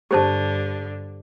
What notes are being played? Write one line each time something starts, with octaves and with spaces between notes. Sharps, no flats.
G2 D3 G4 C5 A5